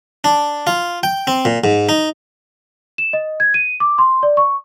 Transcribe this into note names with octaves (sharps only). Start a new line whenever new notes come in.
D4
F4
G5
C4
A#2
G#2
D#4
E7
D#5
G#6
D#7
D6
C6
D5
C#6